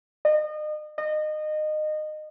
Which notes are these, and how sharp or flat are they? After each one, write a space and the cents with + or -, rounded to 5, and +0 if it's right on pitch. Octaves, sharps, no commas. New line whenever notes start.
D#5 -35
D#5 -25